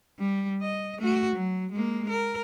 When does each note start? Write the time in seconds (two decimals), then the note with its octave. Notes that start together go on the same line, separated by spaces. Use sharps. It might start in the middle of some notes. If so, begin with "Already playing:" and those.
0.19 G3
0.62 D#5
0.98 A3 F#4
1.35 F#3
1.72 G#3 A#3
2.10 A#4